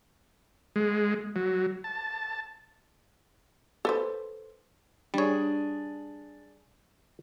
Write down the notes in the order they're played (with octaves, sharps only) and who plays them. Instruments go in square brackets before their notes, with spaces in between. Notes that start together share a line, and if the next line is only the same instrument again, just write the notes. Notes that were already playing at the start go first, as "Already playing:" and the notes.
[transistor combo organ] G#3
F#3
A5
[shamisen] A4 B4 C5
[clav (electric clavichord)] G3 C#5 [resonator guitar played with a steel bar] D4 G#4